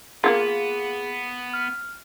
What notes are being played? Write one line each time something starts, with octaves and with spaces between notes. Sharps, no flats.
A#3 B3 E4 F4 G#4
F6